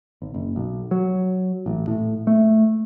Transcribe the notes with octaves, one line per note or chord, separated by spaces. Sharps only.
G#1
F#1
B1
F#3
A1
A2
A3